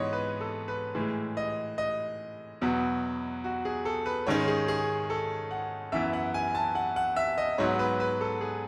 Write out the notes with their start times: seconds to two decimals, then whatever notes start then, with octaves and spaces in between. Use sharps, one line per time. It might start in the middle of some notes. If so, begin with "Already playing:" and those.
Already playing: G#2 E3 B3 C#5 D#5
0.13 B4
0.41 A4
0.68 B4
0.95 A2 E3 G#3
1.37 D#5
1.78 D#5
2.61 E2 B2 F#3 B3
3.44 F#4
3.65 G#4
3.85 A4
4.06 B4
4.27 G#2 D#3 G#3 C#4 C#5
4.47 G#4
4.68 G#4
5.10 A4
5.51 F#5
5.92 F#2 E3 B3 E5
6.13 F#5
6.34 G#5
6.55 A5
6.75 F#5
6.96 F#5
7.16 E5
7.38 D#5
7.58 G#2 F#3 B3 C#5
7.79 B4
8.00 B4
8.21 A4
8.41 G#4